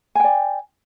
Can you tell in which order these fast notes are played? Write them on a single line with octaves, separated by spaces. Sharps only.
G#5 G5 D5